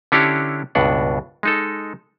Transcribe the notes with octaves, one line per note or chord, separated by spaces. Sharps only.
D3 C#4 D4 E4 G4 C#5
C#2 G2 B2 D4 F#5
G#3 D#4 A4